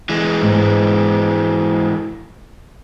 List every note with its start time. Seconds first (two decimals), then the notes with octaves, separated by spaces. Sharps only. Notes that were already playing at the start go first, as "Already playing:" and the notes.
0.09 E3 G#3
0.42 G#2